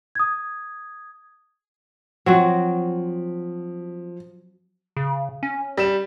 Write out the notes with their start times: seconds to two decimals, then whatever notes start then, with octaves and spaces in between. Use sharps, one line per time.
0.15 D#6 G#6
2.26 F3 F#3 C4 F#4
4.97 C#3
5.43 C#4
5.77 G3 E7